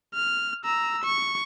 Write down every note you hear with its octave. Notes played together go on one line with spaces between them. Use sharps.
F6
A#5 E6
C#6